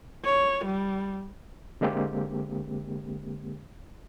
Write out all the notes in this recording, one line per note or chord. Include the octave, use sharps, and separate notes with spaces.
C#5
G3
D3 G#3 A#3 C4 G4